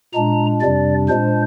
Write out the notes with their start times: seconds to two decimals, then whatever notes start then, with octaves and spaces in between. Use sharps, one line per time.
0.14 A#2 G#3 D4 A#5
0.61 F2 C3 G3 D4 D5
1.09 A#2 G#3 D4 C5